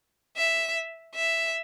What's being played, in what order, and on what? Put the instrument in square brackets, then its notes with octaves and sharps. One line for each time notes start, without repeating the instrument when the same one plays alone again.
[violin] E5
E5